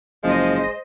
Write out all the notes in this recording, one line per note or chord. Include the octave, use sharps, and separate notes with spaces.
F#1 F3 G#3 C5 D#5